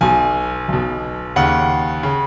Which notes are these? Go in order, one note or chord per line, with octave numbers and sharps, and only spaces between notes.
B1 B2 G#5
B1 B2
D#2 C#3 F#5
C#3